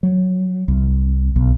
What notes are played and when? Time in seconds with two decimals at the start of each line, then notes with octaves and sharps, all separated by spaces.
0.03 F#3
0.68 C2
1.36 B1